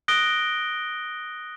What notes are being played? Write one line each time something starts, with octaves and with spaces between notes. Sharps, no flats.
D#6 F#6 A#6 D7 G7